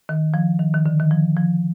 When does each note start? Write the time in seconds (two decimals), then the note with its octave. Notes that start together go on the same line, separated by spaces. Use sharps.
0.09 D#3
0.34 F3
0.59 D#3
0.74 D#3
0.86 D3
1.00 D#3
1.11 F3
1.37 F3